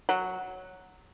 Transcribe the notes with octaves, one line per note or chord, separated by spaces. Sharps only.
F#3